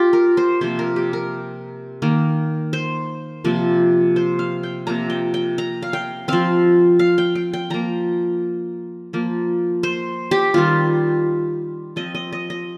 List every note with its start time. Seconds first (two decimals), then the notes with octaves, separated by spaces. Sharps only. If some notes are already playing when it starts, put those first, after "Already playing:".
Already playing: F4 G4
0.13 A#4
0.37 C5
0.61 C3 F3 A#3 C5
0.79 A#4
0.96 G4
1.13 A#4
2.02 D#3 A#3
2.73 C5
3.44 C3 F3 A#3
4.16 C5
4.39 F5
4.63 G5
4.87 C3 F3 A#3 A#5
5.10 G5
5.34 G5
5.58 A#5
5.82 F5
5.93 G5
6.28 F3 C4 F5
6.99 F5
7.18 G5
7.35 G5
7.53 G5
7.70 F3 A#3 A#5
9.13 F3 A#3
9.83 C5
10.31 G4
10.54 D#3 G3 C4 F4
11.96 F3 C4 D#5
12.15 D#5
12.33 D#5
12.50 D#5